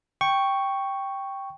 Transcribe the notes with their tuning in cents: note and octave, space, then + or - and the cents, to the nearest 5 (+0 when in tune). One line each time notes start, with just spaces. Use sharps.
G5 +0 C#6 +0